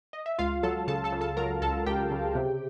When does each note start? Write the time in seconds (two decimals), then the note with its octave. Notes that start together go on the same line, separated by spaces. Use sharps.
0.13 D#5
0.26 E5
0.38 C#2 F4 F5
0.63 F#3 A4 A5
0.88 C#3 A4 A5
1.04 A4 A5
1.12 C#3
1.21 A4 A5
1.37 F#3 A#4 A#5
1.61 C#2 A4 A5
1.86 C#2 G4 G5
2.11 C#3
2.35 C3